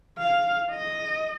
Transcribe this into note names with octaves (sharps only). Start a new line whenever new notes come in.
F5
D#5